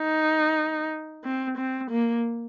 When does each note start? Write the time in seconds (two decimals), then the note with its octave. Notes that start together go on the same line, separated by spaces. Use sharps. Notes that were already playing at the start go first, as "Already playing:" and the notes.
Already playing: D#4
1.24 C4
1.57 C4
1.91 A#3